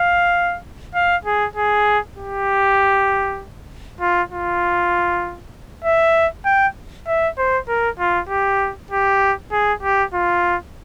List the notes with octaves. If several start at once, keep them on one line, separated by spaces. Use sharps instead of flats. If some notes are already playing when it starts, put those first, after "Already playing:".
Already playing: F5
F5
G#4
G#4
G4
F4
F4
E5
G5
E5
C5
A#4
F4
G4
G4
G#4
G4
F4